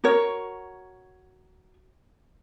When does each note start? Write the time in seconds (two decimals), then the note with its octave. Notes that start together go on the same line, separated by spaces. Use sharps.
0.04 F#4 A#4 C#5